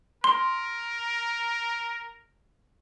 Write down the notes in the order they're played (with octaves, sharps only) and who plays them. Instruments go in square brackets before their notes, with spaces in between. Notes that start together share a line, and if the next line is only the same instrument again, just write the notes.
[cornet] A#4 [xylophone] C6